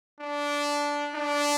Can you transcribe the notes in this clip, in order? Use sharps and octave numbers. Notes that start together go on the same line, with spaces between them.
D4
D4